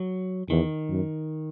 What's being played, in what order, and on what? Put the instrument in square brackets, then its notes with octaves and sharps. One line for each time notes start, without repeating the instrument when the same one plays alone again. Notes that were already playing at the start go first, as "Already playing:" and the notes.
Already playing: [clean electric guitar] F#3
[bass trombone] E2 [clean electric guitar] D#3
[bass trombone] F#2